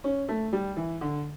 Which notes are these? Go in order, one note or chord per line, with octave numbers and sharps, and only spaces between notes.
C#4
A3
G3
E3
D3